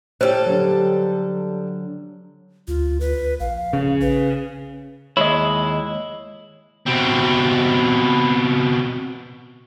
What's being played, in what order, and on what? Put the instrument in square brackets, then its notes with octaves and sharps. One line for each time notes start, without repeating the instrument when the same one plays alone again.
[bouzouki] G3 A4 [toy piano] C5 [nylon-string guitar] C#5 G5
[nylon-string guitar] D3 F#3
[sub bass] D2 [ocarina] F4
[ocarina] B4
[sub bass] A#1 [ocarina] F5
[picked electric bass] C#3
[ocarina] B4
[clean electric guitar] D#2 G#3 E4 [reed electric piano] C#5 D#5
[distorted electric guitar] B2 C4